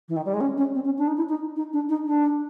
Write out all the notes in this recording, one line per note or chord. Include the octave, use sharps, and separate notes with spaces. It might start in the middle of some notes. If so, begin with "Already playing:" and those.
E3
D#3
G3
G#3
C#4
C#4
C4
C#4
D4
D#4
E4
D#4
D#4
D4
D#4
D4